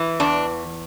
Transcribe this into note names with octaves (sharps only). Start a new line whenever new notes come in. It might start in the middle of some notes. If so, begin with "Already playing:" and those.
Already playing: E3
E2 D4